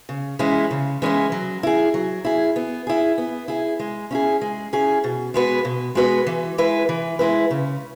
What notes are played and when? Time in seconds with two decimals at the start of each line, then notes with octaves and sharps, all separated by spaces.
0.09 C#3
0.39 E3 G#3 C#4 E4
0.71 C#3
1.02 E3 G#3 C#4 E4
1.32 F#3
1.63 E4 G#4
1.94 F#3
2.25 E4 G#4
2.56 B3
2.87 E4 G#4
3.18 B3
3.48 E4 G#4
3.79 G#3
4.11 C#4 E4 G#4
4.41 G#3
4.73 C#4 E4 G#4
5.04 B2
5.34 G#3 B3 F#4 B4
5.65 B2
5.95 G#3 B3 F#4 B4
6.27 E3
6.58 G#3 E4 B4
6.89 E3
7.19 G#3 E4 B4
7.51 C#3